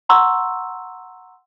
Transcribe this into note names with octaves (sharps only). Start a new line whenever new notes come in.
F#5 A#5 C6 C#6 E6